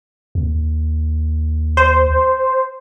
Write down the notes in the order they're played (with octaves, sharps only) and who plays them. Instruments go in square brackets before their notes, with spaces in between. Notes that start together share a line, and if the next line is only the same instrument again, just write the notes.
[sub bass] D#2
[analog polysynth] C5